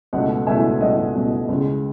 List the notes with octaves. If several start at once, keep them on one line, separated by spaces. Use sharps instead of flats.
C#2 B2 A3 D#5 F#5
C#2 B2 A3 E5 G#5
C#2 B2 A3 D#5 F#5
C#2 B2 A3
C#2 C#3 G#3